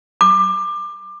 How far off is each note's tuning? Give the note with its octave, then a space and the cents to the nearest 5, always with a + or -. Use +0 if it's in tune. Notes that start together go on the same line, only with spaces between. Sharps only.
D6 +25